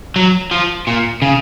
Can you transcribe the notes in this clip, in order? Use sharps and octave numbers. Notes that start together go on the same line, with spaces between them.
F#3
F3
A#2
C#3